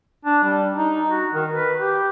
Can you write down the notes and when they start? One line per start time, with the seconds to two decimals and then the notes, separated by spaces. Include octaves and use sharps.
0.25 D4
0.44 G3
0.75 D#4
1.09 F#4
1.33 D#3
1.53 B4
1.80 G4